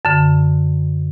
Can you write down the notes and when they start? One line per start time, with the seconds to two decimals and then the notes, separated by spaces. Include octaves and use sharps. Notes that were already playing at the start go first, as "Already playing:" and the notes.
0.05 F#2 D3